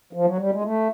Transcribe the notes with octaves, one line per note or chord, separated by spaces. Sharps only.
F3
F#3
G3
G#3
A3